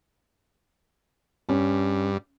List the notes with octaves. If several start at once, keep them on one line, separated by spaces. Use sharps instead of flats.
G2 C#4